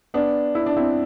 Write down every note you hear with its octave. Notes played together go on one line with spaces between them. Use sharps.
B3 D4
E4
D4
C4 E4